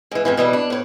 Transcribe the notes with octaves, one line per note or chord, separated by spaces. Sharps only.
G#2 E3
F2 G#2 E3
B2 E3 G3
D4
A2 B4 C#5